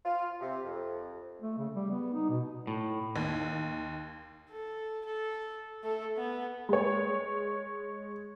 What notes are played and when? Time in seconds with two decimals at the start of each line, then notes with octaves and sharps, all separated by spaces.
0.05 F4
0.40 C3
0.64 F2
1.42 A3
1.58 C#3
1.75 G3
1.91 B3
2.14 D#4
2.29 B2
2.67 A2
3.16 D#2
4.51 A4
5.05 A4
5.83 A3 A4
6.17 B3
6.69 G#3 C#5